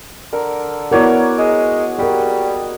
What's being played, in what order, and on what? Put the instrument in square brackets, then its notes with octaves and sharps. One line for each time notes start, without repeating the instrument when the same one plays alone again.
[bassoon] D3 [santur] A#4
[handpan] B3 E4 A#4 [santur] F#4 C#5 D5
[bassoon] G#3 [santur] D#5
[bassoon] G3 [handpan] F#4 G#4 A#4